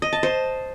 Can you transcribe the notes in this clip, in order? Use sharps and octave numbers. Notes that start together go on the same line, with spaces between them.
D#5
A5
C5